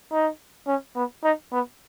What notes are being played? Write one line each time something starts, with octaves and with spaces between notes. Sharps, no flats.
D#4
C#4
B3
D#4
B3